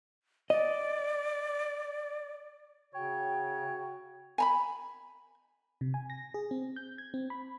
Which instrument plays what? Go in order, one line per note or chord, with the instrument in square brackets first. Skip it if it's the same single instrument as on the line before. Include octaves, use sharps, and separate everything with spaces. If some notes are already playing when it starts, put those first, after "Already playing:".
[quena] D5 [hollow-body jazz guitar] D#5
[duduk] C#3 [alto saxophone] F#4 [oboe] C#5 [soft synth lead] G5
[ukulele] G#5 A#5 B5
[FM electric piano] C3
G#5
A#6
G#4
C4
G6
G#6
C4
B5